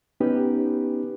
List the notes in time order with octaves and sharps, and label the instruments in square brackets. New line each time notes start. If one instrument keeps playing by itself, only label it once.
[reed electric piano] B3 C#4 D#4 G4 B4